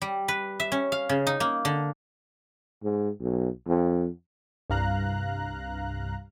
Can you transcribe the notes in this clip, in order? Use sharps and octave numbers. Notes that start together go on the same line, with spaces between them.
G3
B4
E5
C#4
F5
C#3
D#4
A#3
D3
G#2
B1
F2
C2 G2 F5 A#5 F#6